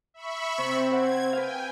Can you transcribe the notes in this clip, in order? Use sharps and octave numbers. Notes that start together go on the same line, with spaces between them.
E5 B5 C#6
C3 C4
C5 F#5 G#6
B4 F5 G5 G#5